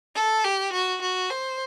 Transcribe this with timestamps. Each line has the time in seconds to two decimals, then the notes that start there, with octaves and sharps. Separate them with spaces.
0.15 A4
0.44 G4
0.72 F#4
1.01 F#4
1.30 C5